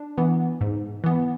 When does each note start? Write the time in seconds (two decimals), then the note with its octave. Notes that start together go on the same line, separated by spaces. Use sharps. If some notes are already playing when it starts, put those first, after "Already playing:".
Already playing: D4
0.18 E3 B3
0.61 G#2
1.04 E3 B3